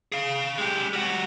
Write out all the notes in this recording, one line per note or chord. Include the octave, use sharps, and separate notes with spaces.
G#4 F5
G#3 G4
G3 F#4